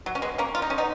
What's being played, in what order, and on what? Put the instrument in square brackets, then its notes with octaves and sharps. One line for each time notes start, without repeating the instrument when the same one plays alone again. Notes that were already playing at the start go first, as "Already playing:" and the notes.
[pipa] F#3
C#4
G#3 B3
A#3 C#4
F4
D#4
C#4
B3 D#4